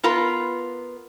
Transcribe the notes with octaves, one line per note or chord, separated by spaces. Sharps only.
B3 F4 A#4 B4